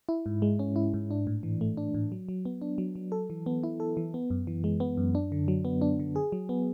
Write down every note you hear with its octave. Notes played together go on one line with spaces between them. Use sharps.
E4
G#2
G#3
C#4
E4
G#2
D4
A2
E3
A3
D4
A2
F#3
F#3
B3
D4
F#3
F#3
A4
E3
B3
E4
A4
E3
B3
F#2
E3
G#3
B3
F#2
D4
D3
F#3
B3
D4
D3
G#4
F#3
B3